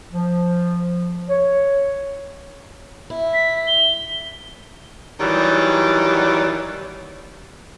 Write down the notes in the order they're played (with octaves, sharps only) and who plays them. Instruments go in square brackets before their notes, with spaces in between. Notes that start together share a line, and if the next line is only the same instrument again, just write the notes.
[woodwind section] F3
C#5
[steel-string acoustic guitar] E4
[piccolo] B6
G7
[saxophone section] D#3 E3 F#3 G3 G4 D5